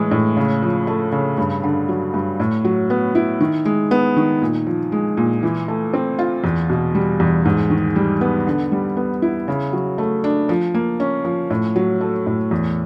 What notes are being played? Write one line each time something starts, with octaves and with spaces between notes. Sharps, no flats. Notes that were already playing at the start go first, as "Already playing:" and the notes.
Already playing: A2 E3 G#3
A2
C#3
F3
A3
C#3
G2
D3
F#3
G2
A2
F#3
B3
E4
D#3
G#3
B3
D#3
A#2
F3
G#3
A#2
E3
A3
C4
F4
E2
B2
G3
E2
G#2
D#3
G3
B3
D3
G3
B3
E4
C#3
F#3
A3
D4
F3
A#3
C#4
F3
A2
F#3
A3
A2
E2